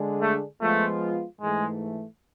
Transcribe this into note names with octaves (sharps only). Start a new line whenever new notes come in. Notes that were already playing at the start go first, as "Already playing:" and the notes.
Already playing: D3 G#3 D4 G#4
A3
F3 G#3 A3 B3 F4
G#2 E3 G#3 A3